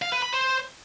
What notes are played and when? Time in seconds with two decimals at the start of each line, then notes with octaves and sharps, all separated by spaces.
0.02 F5
0.12 B4
0.22 B5
0.33 C5